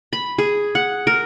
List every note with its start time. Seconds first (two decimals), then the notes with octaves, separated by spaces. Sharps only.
0.13 B5
0.38 G#4
0.75 F#5
1.07 A#4